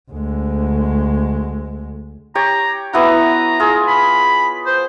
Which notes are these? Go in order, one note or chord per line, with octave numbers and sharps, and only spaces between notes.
D2 G#3
G4 C#5 A#5
B3 E4 F#4 A#5
F4 G#4
B5
C5